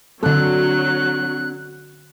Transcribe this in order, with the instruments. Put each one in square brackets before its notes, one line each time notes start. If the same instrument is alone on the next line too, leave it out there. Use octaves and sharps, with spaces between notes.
[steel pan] D3 A4 [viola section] F#3 [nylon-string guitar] C4 D4 [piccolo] F#6